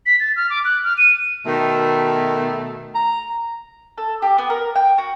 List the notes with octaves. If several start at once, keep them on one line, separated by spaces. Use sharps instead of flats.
B6
A6
F6
D6
F#6
F6
D#7
B2 D#3 A3
A#5
A4
G4
B3
A#4
G5
F#4